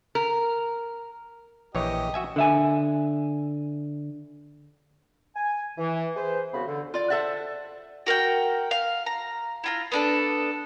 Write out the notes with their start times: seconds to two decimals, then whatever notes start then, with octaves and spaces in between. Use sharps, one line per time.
0.15 A#4
1.75 A#1 E3 G4 C#5 D#5
2.14 F#4 E5 G#5
2.36 D3 E5 G#5
5.36 G#5
5.77 E3
6.15 G#4 B4 C5
6.53 C2 C#3 B3 F#4 B5
6.67 D3
6.94 F4 D5
7.10 A4 C5 E5 F#5
8.06 F#4 A#4 F#5 G5
8.71 F5
9.06 A#5
9.64 E4 F4 A#5
9.92 B3 D4 A4